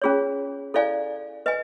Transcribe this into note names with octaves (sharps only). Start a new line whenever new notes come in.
C#4 F4 G#4 C#5
E4 A4 D5 F5 G#5
B4 D#5 G#5